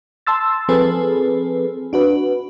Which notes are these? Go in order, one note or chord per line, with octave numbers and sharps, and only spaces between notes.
A5 C6 E6 A6
F3 C4 G#4 A4 B4
D4 F#4 B4